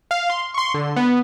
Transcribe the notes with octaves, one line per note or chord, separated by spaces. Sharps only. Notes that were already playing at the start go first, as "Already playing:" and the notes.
F5
C6
C6 C#6
D3
B3